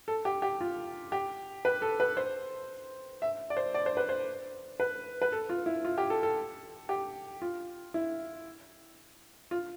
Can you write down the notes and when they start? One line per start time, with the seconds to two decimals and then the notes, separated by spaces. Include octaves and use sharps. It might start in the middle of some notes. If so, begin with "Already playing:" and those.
0.08 A4
0.25 G4
0.42 G4
0.61 F4
1.12 G4
1.65 B4
1.82 A4
2.00 B4
2.17 C5
3.22 E5
3.50 D5
3.57 C5
3.74 D5
3.86 C5
3.97 B4
4.09 C5
4.80 B4
5.22 B4
5.32 A4
5.50 F4
5.66 E4
5.85 F4
5.98 G4
6.10 A4
6.23 A4
6.89 G4
7.42 F4
7.94 E4
9.51 F4